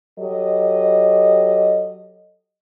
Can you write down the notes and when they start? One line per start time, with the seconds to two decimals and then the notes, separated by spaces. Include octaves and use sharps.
0.19 F#3 G4 A4 D#5